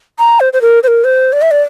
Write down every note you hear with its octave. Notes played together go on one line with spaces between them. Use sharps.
A#5
C5
C5
A#4
C5
A#4
C5
D5
E5
D5